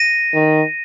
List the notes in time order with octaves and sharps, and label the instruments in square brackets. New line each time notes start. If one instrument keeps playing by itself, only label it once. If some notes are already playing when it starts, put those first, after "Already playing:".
Already playing: [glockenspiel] A#6 D#7
[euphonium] D#3